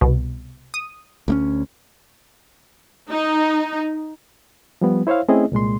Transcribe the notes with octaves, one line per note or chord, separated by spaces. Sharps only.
C2 B2
D#6
D2 A#3 C#4
D#4
F3 G3 B3
E4 C5 C#5 E5 F5
A3 C4 C#4 E4 G#4 D#5
C2 A#2 G#3 C6